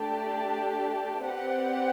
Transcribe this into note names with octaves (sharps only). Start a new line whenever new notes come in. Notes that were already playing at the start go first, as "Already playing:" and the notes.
Already playing: A3 D4 G4 D5 A5
C4 G4 B4 D5 F#5